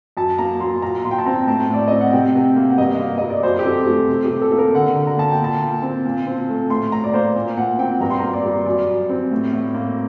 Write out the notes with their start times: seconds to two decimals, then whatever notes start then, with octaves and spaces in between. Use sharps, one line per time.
0.17 F#2 A5
0.38 A#3 A#5
0.60 F#3 C6
0.82 A#2 A#5
1.04 A#2 C6
1.11 G5
1.19 A5
1.25 C4 A#5
1.47 A2 A5
1.70 A2 D5
1.88 C4 D#5
2.01 F#5
2.13 C3 G5
2.35 C3
2.56 A#3
2.70 F#5
2.78 G2 D#5
2.99 A#3
3.18 G3 D#5
3.30 D5
3.43 F#2 C5
3.59 G4
3.65 C4 A4
3.86 A3 G4
4.08 C3
4.25 G4
4.30 C3
4.42 A4
4.52 A#3 A4
4.58 A#4
4.74 D3 F#5
4.96 D3
5.07 A#5
5.17 A#3 A5
5.32 G5
5.40 A#2 A5
5.61 A#2
5.82 C4
6.05 A#2
6.27 C4
6.49 A3
6.70 A2 C6
6.92 A2 A#5
7.04 D5
7.14 A#3 C5
7.36 A#2
7.57 A#2 F#5
7.78 C4 G5
8.00 G2 A#5
8.10 C6
8.20 A#3 A#5
8.33 D5
8.45 G3
8.66 F#2 D5
8.87 F#2
9.09 C4
9.31 A2
9.53 A2
9.75 A#3